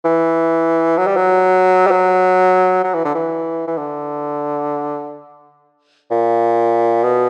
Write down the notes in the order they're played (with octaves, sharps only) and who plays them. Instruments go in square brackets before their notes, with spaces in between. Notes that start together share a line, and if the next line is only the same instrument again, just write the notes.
[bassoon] E3
F#3
G3
F#3
G3
F#3
F#3
E3
D3
E3
E3
D3
A#2
B2